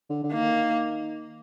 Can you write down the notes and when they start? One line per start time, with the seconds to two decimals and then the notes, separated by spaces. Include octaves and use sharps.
0.10 D3
0.24 D3
0.32 D#3 A#3